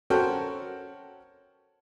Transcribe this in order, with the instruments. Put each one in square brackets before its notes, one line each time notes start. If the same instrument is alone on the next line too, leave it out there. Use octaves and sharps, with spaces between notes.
[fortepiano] C#4 F#4 A4 A#4 C5 G5